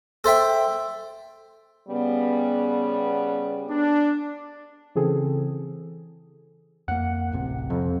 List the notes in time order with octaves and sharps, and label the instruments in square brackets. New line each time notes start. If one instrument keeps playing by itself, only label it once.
[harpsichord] A4 C5 E5 G5
[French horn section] C#3 G3 B3
[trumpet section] D4
[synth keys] C#3 E3 C4 G#4 A4
[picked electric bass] F2 A#3 [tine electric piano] F#5
[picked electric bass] D1 A1 C3
[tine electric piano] F2 [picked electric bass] C3